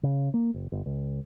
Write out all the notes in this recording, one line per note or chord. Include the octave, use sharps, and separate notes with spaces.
C#3
A#3
F#1
G1
C#2